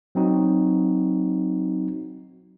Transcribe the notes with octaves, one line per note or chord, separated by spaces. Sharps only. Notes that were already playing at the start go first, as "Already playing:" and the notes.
F#3 C4 D#4 F#4